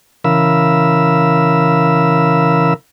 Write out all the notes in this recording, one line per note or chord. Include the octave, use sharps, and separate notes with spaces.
C#3 E3 A#4 F5 B5 E6